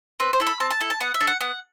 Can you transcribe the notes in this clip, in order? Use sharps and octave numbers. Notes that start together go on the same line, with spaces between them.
C4 B4
C5
E4 A4
B5
C4 A5
A5
E4 A4
A5
B3 F#5
E5
D4 A4
F#5
B3 F#5